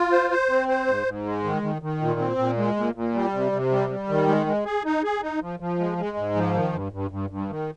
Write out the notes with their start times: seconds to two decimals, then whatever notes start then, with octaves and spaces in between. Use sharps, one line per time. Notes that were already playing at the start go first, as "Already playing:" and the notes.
Already playing: F4
0.12 C5
0.31 C5
0.50 C4
0.68 C5
0.87 G#2
1.07 G#2
1.25 G#3
1.44 D#3
1.63 D#3
1.82 D#3
2.01 A#2
2.20 C4
2.38 A#2
2.57 G#3
2.76 A#2
2.95 A#2
3.14 G3
3.33 C3
3.52 C3
3.71 G3
3.90 G3
4.09 D#3
4.28 G#3
4.47 G#3
4.65 G#4
4.85 D#4
5.03 G#4
5.22 D#4
5.41 F3
5.60 F3
5.79 G#3
5.98 G#3
6.17 G#2
6.35 F3
6.54 D#3
6.73 G2
6.92 G2
7.11 G2
7.30 G2
7.49 D#3